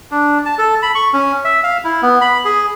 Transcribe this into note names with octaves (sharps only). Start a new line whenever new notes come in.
D4
A5
A4
B5
C#6
C#4
E5
F5
E4
B3
B5
G#4